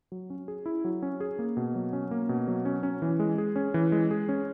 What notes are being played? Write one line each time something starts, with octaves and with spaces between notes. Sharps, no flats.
F#3
C#4
G#4
E4
F#3
C#4
G#4
A#3
B2
F#3
C#4
A#3
B2
F#3
C#4
C#4
E3
G#3
G#4
C#4
E3
G#3
G#4
C#4